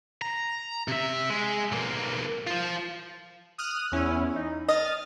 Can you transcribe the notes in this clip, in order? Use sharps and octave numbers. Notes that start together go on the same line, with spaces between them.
A#5
C3 E5
G#3
B1 A#3
F4 C5
D#6 F6 F#6
E2 C#4 E4
D#4
D#5 D#6 F6 A6